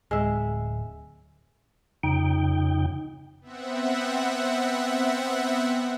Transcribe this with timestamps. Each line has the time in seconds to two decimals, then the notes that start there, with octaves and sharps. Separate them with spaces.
0.11 D1 G#3 E5
2.03 F2 C#3 D#4 G5
3.41 B3 C4 E5 F#5